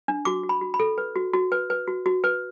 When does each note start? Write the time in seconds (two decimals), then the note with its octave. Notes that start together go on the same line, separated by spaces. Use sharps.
0.08 D4
0.25 F#4 D6
0.43 F#4
0.49 B5
0.61 F#4
0.74 B5
0.80 A4
0.98 B4
1.16 F#4
1.34 F#4
1.52 B4
1.70 B4
1.87 F#4
2.06 F#4
2.24 B4